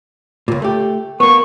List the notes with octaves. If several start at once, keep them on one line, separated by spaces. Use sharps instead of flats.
C#2 A#2
A3 G4
A#3 B3 C#6